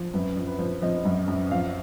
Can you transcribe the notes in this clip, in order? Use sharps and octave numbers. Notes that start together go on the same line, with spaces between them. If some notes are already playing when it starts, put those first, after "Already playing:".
Already playing: F3
F#2 B4
F3
B4
F3
F3 D#5
F#2
F#2
F3 F5